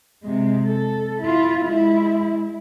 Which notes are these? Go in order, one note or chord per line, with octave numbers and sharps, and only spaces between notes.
C3 G#3
A4
E4 F4
G#3 E4